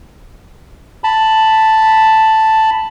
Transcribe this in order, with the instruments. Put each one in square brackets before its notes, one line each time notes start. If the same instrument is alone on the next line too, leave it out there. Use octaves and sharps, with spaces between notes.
[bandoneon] A5 B5